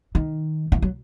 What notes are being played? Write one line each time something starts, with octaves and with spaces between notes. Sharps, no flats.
D#3
E3
F#3